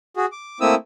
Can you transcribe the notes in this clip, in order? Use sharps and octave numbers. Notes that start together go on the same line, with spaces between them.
F#4 G#4
D6
A3 A#3 C4 E4 D#6 E6